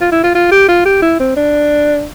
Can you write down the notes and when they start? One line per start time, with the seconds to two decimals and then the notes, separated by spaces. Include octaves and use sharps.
0.01 F4
0.12 E4
0.23 F4
0.35 F4
0.51 G4
0.68 F4
0.85 G4
1.02 E4
1.20 C4
1.36 D4